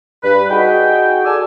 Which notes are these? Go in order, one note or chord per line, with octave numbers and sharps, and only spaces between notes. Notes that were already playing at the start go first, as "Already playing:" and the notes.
G2 B4
D#4 F#4 G#4 G5
G#4 A4 D5 G#5 D6 E6